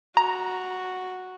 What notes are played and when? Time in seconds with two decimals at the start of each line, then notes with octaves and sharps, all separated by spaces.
0.17 F#4 A#5